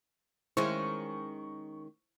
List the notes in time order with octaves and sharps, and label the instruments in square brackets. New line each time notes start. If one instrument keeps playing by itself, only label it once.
[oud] D#3 G#3 C#4 [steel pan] E4 C5 [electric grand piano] C#6